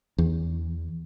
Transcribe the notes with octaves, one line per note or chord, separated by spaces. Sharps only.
E2